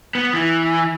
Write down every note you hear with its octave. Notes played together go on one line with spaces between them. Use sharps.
B3
E3